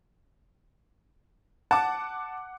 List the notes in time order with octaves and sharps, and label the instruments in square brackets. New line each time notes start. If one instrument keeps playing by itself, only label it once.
[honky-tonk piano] F#5 D6 [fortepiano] A5